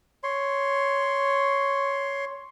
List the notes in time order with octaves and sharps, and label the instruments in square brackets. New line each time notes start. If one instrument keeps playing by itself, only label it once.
[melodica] C#5 C6